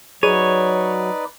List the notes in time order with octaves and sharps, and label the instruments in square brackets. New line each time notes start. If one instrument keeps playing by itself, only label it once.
[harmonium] F#3 [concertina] D#4 B4 D5 [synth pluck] G#4 D#7 [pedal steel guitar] C#5